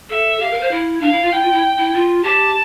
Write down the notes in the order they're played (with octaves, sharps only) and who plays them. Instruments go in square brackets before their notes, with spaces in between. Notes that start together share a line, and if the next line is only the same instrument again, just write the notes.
[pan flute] A4 [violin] E5
[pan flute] G4 [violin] F5
[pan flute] A#4
C5
E4
[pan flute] D4 [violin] F5
[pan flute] E4
F4
[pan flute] E4 [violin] G5
[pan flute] F4
E4
E4
F4
[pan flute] G4 [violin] A5